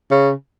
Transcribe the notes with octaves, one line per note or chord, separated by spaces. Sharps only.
C#3